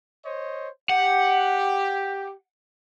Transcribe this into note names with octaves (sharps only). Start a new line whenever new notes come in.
C5 C#5 D#5
G4 F#5